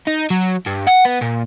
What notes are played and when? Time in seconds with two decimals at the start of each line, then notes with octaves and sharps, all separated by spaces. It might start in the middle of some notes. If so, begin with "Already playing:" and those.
0.07 D#4
0.30 F#3
0.66 G2
0.87 F#5
1.06 B3
1.22 A#2